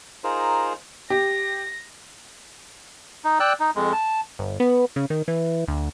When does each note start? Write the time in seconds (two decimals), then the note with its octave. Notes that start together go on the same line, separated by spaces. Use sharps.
0.24 D#4 F4 G#4 A#4 C5
1.10 G4 A#6
3.24 D#4
3.40 D5 G5 E6 F#6
3.60 D#4
3.76 F2 G#3
3.93 A5
4.39 G1
4.60 B3
4.96 C#3
5.10 D#3
5.28 E3
5.68 D2